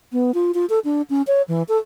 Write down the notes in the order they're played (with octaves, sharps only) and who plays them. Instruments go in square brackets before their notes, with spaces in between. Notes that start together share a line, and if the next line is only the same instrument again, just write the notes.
[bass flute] B3
F4
F4
A4
D4
C#4
C#5
E3
A4